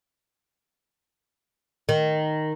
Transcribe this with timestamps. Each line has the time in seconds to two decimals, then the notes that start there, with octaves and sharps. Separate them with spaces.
1.89 D#3